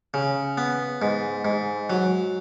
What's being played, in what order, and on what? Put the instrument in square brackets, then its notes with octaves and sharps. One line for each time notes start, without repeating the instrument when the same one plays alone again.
[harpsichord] C#3
B3
G#2
G#2
F#3